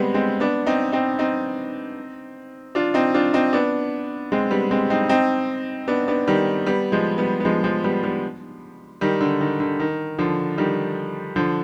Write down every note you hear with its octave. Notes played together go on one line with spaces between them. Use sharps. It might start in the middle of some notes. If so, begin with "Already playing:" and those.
Already playing: G3 G#3 B3 C4
G#3 C4
B3 D4
C4 D#4
C4 D#4
C4 D#4
D4 F4
C4 D#4
D4 F4
C4 D#4
B3 D4
G#3 C4
G3 B3
G#3 C4
C4 D#4
C4 D#4
B3 D4
B3 D4
D#3 G3
G3 B3
F3 G#3
G3 B3
B3
F3 G#3
F3 G#3
G3 B3
G3 B3
D#3 G3
D3
D#3
D3
D#3
D3 F3
D#3 G3
D3 F3